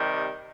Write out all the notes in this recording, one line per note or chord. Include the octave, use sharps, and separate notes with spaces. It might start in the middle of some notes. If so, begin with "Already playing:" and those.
Already playing: C3 D#3 G3